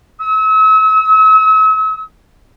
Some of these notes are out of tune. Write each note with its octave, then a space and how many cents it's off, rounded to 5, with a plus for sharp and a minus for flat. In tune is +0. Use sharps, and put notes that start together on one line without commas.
E6 -40